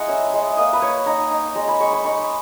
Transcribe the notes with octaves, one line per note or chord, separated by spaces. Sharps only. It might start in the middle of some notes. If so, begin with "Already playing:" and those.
Already playing: G#3 E4 F#5 A#5
C#4 E5
G#3
A#3 D#5
B4
A#3 C#5
D#4 A#5
D#4
G#3 A#5
B5
G#3 C#6
B5
D#4 C#6